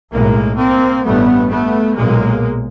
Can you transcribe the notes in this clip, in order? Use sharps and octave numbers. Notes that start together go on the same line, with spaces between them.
B1 A2 G#3 A#3
A#3 C4
A1 G2 A3 B3
A3 B3
B1 A#2 G#3 A#3